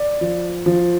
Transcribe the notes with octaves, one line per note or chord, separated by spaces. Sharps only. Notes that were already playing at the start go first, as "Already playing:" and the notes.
Already playing: D5
F3
F3